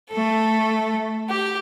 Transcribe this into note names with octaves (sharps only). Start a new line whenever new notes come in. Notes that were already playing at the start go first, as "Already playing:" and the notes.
A3 A4
G4